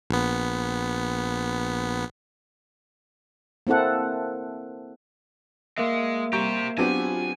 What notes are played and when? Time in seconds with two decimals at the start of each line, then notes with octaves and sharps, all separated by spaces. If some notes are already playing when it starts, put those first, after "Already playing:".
0.10 A#1 B3
3.67 A#3 C4 E4 A4 F#5
5.78 G#3 A#3 E5
6.33 G3 G4 C5 A#5 C#6 G6
6.78 F#3 B3 C4 D4 F4 G4 G#5